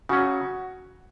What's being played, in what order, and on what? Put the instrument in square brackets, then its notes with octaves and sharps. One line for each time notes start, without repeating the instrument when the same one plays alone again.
[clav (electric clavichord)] C#3 F#3 C#4 [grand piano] F#4